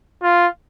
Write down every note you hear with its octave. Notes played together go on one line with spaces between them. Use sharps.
F4